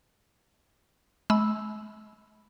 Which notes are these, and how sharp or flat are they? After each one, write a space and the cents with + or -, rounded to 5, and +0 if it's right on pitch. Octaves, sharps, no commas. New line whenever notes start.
G#3 +45 B5 +0 E6 -5